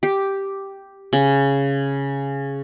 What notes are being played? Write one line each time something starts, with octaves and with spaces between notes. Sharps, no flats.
G4
C#3